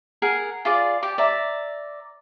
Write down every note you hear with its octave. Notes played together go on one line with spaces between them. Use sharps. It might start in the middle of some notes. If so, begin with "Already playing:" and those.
G#4 A#4 F#5
F4 G#4 D5
G4 D6
D5 E5 A#5